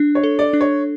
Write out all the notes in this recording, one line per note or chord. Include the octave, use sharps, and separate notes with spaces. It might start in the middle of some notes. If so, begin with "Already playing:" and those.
Already playing: D4
C#5
A4
D5
D4
C#5